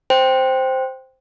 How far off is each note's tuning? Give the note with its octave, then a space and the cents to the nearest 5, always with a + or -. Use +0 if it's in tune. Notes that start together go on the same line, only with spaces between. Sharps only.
C5 +0 G5 +0